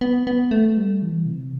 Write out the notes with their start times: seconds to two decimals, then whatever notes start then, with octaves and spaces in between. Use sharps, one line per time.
0.01 B3
0.27 B3
0.51 A3
0.77 G3
1.02 E3
1.26 C3